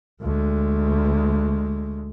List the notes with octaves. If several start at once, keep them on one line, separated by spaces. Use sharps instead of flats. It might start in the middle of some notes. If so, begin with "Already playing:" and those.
D2 G#3